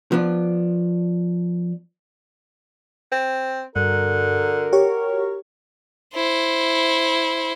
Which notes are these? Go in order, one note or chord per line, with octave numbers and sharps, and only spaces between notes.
F3 B3 D4
C4
G2 D3 F#4 A#4
G4 C#5 C#6
E4 C5